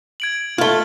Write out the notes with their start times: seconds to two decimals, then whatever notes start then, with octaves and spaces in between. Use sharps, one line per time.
0.20 G#6 D7 F#7
0.58 A3 F4 G#6 G7